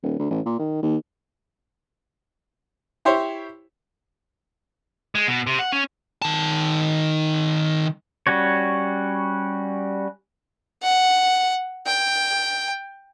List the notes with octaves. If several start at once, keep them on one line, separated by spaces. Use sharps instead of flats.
D#1
D2
A1
A#2
D#3
D#2
E4 G4 C5 C#5
G#3
B2
C3
F#5
C#4
D#3 A5
G3 C#4 F#4 C#5
F#5
G5